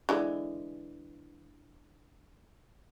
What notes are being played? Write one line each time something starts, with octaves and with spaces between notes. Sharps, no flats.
D3 E3 G#3